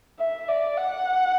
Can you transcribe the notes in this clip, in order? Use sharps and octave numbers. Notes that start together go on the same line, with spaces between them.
E5
D5
F#5